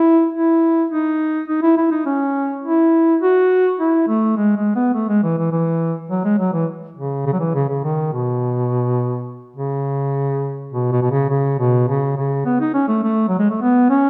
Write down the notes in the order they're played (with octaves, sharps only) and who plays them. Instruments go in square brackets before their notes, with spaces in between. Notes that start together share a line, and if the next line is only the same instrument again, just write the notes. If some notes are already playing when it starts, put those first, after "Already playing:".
Already playing: [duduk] E4
E4
D#4
D#4
E4
E4
D#4
C#4
E4
F#4
E4
A3
G#3
G#3
B3
A3
G#3
E3
E3
E3
F#3
G#3
F#3
E3
C#3
C#3
F#3
E3
C#3
C#3
D#3
B2
C#3
B2
B2
B2
C#3
C#3
B2
C#3
C#3
B3
D#4
C#4
A3
A3
F#3
G#3
A3
B3
C#4